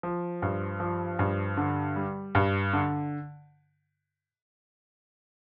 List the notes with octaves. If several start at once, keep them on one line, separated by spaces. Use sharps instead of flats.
F3
G2
F3
G2
D3
G3
G2
D3